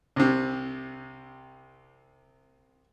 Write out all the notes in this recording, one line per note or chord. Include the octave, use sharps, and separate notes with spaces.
C2 C3